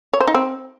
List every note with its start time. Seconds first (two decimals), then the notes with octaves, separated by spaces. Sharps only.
0.13 C#5
0.20 C5
0.27 D#4
0.34 C4